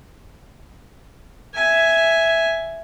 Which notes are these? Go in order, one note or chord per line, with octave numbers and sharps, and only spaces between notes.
E5 G#5